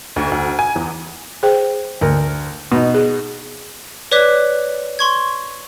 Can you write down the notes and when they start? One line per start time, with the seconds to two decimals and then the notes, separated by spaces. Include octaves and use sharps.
0.16 D2
0.32 D2
0.59 G#5
0.76 E2
1.43 G#4 C5 G5
2.01 D2 A#4
2.72 B2 D#4
2.94 G#4
4.11 B4 C#5 D5 D6 F#6 B6
4.99 C6 C#6 G#6